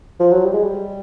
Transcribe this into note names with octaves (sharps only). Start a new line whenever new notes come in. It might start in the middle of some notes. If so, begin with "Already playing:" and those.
F3
F#3
G3
G#3
G3